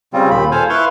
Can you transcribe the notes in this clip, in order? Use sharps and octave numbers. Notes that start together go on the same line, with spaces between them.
C#3 G3 C4 F4
D#2 A#2 B5
A4 C5 F5 G#5
E4 B4 F5 C6 C#6